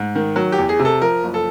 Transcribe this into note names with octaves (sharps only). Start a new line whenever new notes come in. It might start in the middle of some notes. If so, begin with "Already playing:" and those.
Already playing: G#2
D#3
F#3
G4
E2
G#4
C3
A4
F3 A#4
F#1
A4